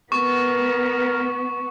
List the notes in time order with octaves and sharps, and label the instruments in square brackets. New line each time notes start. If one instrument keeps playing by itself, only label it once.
[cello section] B3 [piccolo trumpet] A#4 [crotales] C#6